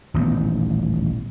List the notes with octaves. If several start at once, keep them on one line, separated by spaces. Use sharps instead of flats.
D#1 A1 D#2 B3